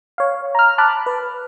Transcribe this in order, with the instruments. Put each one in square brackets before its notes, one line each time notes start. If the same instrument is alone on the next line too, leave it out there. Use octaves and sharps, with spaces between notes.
[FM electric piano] C#5 F5
A#5 F6
A5 B5 D6 F6 F#6
B4